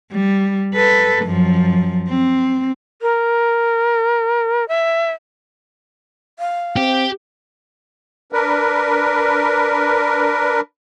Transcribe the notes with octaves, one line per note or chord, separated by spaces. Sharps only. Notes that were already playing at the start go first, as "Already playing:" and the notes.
G3
A4 B4
F#2 F3
C4
A#4
E5
F5
C4 G4
D4 A#4 B4